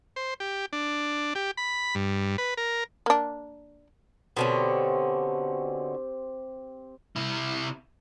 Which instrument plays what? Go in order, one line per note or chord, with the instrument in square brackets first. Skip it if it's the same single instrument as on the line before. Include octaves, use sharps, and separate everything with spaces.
[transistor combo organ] C5
G4
D4
G4
B5
G2
B4
A#4
[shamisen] A#3 D4
[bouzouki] B2 D3 C#4 [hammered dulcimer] C4 G4 C5
[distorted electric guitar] C3 E4